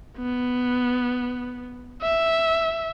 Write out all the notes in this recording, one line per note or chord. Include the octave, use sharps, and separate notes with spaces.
B3
E5